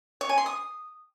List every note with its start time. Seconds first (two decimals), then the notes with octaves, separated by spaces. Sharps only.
0.21 C#5
0.29 G#5
0.38 C6
0.46 D#6